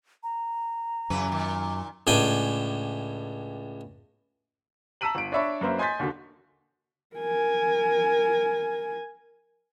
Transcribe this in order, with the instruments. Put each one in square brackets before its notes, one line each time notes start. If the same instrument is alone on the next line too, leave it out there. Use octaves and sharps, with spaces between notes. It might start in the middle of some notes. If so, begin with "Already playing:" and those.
[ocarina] A#5
[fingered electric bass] F#2 [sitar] C#3 E3 B4
[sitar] A#2 D#3
[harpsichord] C#2 A2 D4 G5 G#5
[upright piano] A5 A#5 E6 B6 D#7 F#7
G1 D7
D4 C#5 D5 E5 B5 C#6
F#2 A#3 B4 C5 E5
D#5 G#5 C6 G6 A6 B6
D#2 D3 F#4
[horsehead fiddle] A#4 G#5